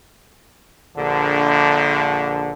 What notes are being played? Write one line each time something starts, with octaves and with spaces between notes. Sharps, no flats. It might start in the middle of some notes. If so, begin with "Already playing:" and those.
A#1 D3